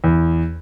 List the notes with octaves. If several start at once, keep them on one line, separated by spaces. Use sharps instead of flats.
E2